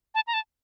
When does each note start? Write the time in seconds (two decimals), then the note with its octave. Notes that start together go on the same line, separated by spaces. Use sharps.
0.15 A5
0.27 A#5
0.34 A5